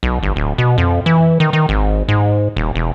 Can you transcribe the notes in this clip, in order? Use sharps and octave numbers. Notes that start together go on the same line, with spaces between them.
B1
G1
D1
B2
F2
E3
D#3
D#3
G#1
G#2
D#1
E1